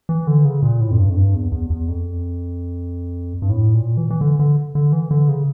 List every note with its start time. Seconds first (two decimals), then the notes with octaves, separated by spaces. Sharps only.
0.09 E3
0.27 D3
0.45 C#3
0.63 A#2
0.81 A2
0.91 F2
0.99 G2
1.10 F2
1.17 G2
1.35 E2
1.52 E2
1.70 E2
1.88 F2
3.42 G2
3.50 A2
3.74 A#2
3.97 E3
4.10 E3
4.21 D3
4.39 D3
4.75 D3
4.92 E3
5.11 D3
5.28 C#3